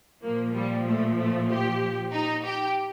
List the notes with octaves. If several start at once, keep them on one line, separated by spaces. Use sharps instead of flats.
A#2 F3 A#3
G3
A3
A3
G4
D#4
G4